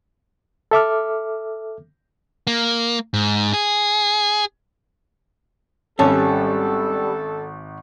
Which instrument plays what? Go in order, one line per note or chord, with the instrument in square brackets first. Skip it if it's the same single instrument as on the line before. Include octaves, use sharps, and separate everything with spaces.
[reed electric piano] A4 E5 D6 F6
[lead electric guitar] A#3
G#2
G#4
[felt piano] G#1 A5 [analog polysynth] G3 [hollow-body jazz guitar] C#4 [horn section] A4